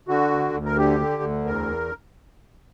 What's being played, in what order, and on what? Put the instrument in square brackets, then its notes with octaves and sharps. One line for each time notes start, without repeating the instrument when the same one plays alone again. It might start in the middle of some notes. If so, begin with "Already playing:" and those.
[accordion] D3 F#4
D2
D2
A#4
D3 G4
D3
D2
E2 A#4